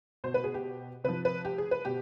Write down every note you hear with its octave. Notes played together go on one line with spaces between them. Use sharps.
B2 C5
B4
G#4
G4
C3 F3 B4
B4
G4
G#4
B4
B2 G4